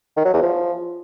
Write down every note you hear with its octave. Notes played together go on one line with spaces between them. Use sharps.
D#3
F#3
E2
F3